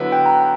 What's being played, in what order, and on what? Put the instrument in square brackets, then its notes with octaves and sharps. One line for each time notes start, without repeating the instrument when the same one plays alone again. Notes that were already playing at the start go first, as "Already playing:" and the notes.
Already playing: [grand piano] D3 F#3 B3 E4
[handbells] G5
A#5